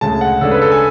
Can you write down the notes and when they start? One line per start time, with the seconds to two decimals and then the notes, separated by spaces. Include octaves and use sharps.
0.01 D2 C#3 G#3 A5
0.21 F#5
0.41 C#3 G#3 D4 A4
0.51 B4
0.62 A4
0.71 G#5